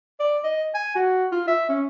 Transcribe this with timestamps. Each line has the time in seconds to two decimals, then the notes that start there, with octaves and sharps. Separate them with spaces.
0.20 D5
0.44 D#5
0.74 G#5
0.95 F#4
1.32 F4
1.47 E5
1.69 C#4